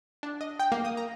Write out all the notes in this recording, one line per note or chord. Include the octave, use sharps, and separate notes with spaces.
D4
D#5
G5
A#3
D#6
A#5